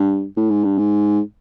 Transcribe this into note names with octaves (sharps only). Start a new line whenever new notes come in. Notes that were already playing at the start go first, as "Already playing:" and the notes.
Already playing: G2
A2
G#2
G2
G#2